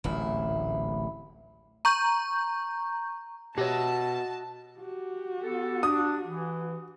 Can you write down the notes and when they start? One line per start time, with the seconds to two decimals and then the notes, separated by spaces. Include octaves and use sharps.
0.04 D1 A1 A#2 E4
1.85 A#5 C#6 G6
3.58 B2 F#4 G4 C#5 D#5 E5 A5
4.80 F#4 G4
5.43 B3 A4
5.83 D4 D#6
6.26 E3